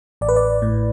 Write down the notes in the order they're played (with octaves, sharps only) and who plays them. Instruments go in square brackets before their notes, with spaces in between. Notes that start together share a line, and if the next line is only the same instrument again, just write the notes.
[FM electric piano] A1 D5
B4
D5
A2